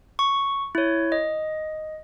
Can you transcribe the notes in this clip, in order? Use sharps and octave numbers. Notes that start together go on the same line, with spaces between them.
C#6
E4 C#5
D#5